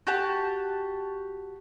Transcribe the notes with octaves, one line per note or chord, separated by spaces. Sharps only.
F#4 G4 A5